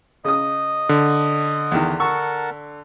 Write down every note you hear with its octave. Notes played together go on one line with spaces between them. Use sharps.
C#3 D#5 D#6
D3
E2 D#3
A#4 F#5 A5 C#6 E6